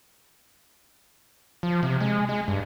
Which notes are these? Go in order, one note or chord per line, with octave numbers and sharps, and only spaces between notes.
F3
C3
G#3
G#3
G2